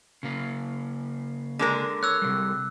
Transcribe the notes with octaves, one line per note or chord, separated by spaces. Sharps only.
C#3 A#3
D3 G#3 A#4
C#5 E6 F#6
C3 G3